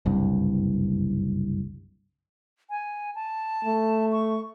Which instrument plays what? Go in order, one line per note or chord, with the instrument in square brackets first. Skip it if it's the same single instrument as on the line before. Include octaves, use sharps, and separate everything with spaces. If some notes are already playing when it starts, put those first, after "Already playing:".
[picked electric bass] F#1 C2 G2
[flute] G#5
A5
[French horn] A3
[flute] C#6